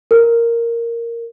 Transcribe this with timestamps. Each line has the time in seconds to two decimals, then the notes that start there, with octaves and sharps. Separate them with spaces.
0.11 A#4